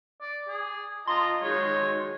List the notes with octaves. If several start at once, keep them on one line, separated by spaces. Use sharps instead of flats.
D5
G#4
F4 D#5 A5 A#5 C6
D#3 F#3 G#3 C#5